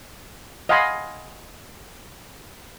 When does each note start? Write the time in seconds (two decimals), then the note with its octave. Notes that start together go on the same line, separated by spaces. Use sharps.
0.69 D#5 F5 F#5 G#5 B5 C6